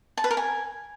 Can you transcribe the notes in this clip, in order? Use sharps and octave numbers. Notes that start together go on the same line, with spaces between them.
A5
B4
A#4
G#5